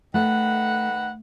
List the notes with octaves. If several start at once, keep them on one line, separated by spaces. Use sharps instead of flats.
D#3 A3 B4 F#5